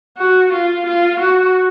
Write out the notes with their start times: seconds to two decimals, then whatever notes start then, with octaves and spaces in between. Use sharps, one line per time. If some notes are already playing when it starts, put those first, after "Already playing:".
0.17 F#4
0.52 F4
0.87 F4
1.20 F#4